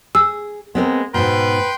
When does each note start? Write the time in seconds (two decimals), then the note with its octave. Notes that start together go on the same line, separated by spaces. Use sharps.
0.15 G#4 E6
0.75 G#3 B3 C4 A#4
1.14 G#2 B2 B4 G5 C6 G6